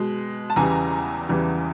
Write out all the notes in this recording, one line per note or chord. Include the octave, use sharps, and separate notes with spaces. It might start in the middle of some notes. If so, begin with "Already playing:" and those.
Already playing: B2 G#3
A5
E2 C#3 E3 G3 G#5 A#5
E2 C#3 E3 G3